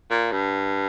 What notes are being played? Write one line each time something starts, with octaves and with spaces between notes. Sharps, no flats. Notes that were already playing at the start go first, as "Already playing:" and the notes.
A#2
G2